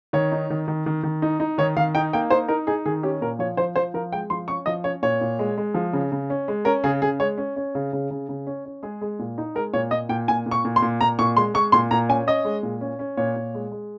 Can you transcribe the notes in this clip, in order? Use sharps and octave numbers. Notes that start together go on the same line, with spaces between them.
D#3 C#5
D#4
D#3
D#3
D#3
D#3
D#4
D#4
D#3 C#5
D#3 F5
D#4 G5
A#3 G5
D#4 C5
D#4 A#4
D#4 G#4
D#3 G#4
C#4 G4
A#2 A#4
F3 C#5
F3 C5
F3 C5
F3 A#4
G#3 G5
F3 C6
C#4 C#6
F3 D#5
C#4 C#5
A#2 C#5
A#2
G#3
G#3
F3
C#3
C#3
C#4
G#3
C#4 A#4
C#3 G#4
C#3 G#4
G#3 C#5
C#4
C#4
C#3
C#3
C#3
C#3
C#4
C#4
G#3 G#4
G#3
A#2
D#4
G#3 A#4
A#2 C#5
A#2 D#5
A#2 G5
A#2 G#5
A#2
C#6
A#2
C6
A#2
A#2 A#5
A#2 C#6
G#3 C6
G#3 C#6
A#2 C6
A#2 A#5
C#4 G#5
C#4 D#5
G#3
A#2
C#4
C#4
A#2 C#5
A#2
G#3
G#3